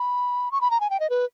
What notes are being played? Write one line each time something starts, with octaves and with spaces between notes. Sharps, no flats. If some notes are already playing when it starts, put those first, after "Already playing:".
Already playing: B5
C#6
B5
A#5
G#5
G5
D#5
B4